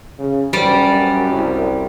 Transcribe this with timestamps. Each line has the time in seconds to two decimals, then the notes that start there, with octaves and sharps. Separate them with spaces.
0.19 C#3
0.53 F#2 G3 D5
1.32 C2